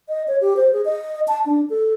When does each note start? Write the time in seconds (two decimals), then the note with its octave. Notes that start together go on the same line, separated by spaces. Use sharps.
0.09 D#5
0.28 C#5
0.41 G4
0.57 C5
0.73 G#4
0.85 D#5
1.28 A5
1.46 D4
1.70 A4